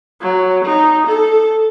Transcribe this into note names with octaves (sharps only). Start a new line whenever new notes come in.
F#3
D#4
A4